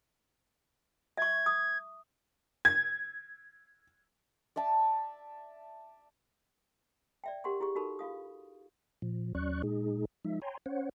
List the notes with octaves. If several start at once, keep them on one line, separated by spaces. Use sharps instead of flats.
E5 C#6 G#6
D#6
G#6
D5 E5 A5
D5 E5 G5
G4 A#4 F#5 C6 C#6
E4 G4 G#4 C#6
D#4 F#4 A4 A#4 B5 C#6
F4 F5 D#6
A#2 F3
D#2 F#3 C#4 D5 C#6 F#6
A#2 G#3 D#4 G#4
F3 G#3 D#4 E5
C#5 G5 G#5 A#5 C6
C#4 C5 C#5 F#5